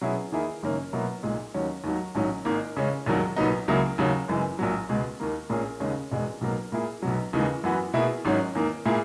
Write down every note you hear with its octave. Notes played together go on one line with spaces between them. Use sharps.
B2 F#3 C#4 E4 G#4
E2 D#3 A#3 E4 G#4
F#1 F#2 D#3 A#3 C#4
B2 F#3 A#3 E4
B1 A#2 G#3
D#2 D#3 F#3 C#4
D#2 D#3 F#3
A#1 G#2 D#3 F#3 C#4
G#1 G#2 D#3 A#3 D#4
E2 C#3 G#3 C#4
E1 D#2 D#3 F#3
B1 A#2 F#3 B3 D#4
C#2 C#3 F#3 A#3 E4
D#2 C#3 F#3 C#4
F#1 F#2 E3 G#3
A#1 A#2 F#3
C#2 B2 G#3
D#2 D#3 A#3
A#1 A#2 A#3 C#4 G#4
D#2 C#3 G#3 C#4
E1 E2 B2 G#3
B1 B2 F#3 A#3
A#2 A#3 E4 G#4
B1 B2 F#3
D#2 C#3 E3 G#3
F#2 E3 B3 F#4
B2 A#3 E4 G#4
G#1 G#2 F#3 C#4
E2 D#3 A#3
A#2 A#3 E4 G#4